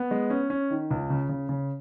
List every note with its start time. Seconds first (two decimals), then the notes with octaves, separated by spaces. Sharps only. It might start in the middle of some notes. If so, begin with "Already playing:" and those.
Already playing: B3
0.11 G#3
0.30 C#4
0.50 C#4
0.70 D#3
0.91 C#2
1.10 C#3
1.29 C#3
1.49 C#3